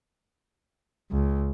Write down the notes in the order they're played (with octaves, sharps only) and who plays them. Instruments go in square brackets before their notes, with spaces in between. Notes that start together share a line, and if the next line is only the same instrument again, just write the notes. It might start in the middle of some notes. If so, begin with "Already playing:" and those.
[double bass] C#2